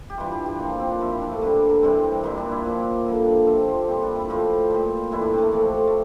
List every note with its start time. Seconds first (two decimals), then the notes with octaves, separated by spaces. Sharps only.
0.10 G4
0.18 G2 E3 G3 F4
0.31 G4
0.46 G4
0.60 A#2 F3 F4
0.69 A#3
0.80 C4
0.90 D4
1.00 C3 F3 E4
1.11 E4
1.21 D4
1.31 A3
1.41 G2 D3 G3 A#3
1.69 A#3
1.83 C3 E3 G3 C4
2.23 A#2 G3 A#3
2.38 D4
2.51 E4
2.66 A#2 F3
3.06 G2 D3 F3
3.47 C3 F3 A4
3.58 G4
3.68 F4
3.78 G4
3.88 A#2 G3 C4
4.02 D4
4.16 E4
4.30 A2 F3 F4
4.71 A#2 G3
5.12 A2 E3 G3 E4
5.22 D4
5.33 C4
5.38 A3 A#3
5.52 C3 F3 A3
5.87 A3